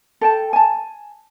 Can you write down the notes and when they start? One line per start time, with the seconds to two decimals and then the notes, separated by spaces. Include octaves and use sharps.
0.21 A4 G5 A5
0.53 G#5 A5